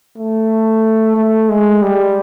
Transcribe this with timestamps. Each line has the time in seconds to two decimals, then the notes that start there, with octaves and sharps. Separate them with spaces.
0.17 A3
1.16 A3
1.49 G#3
1.82 G3